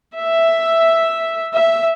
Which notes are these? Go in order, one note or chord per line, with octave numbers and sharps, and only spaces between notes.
E5
E5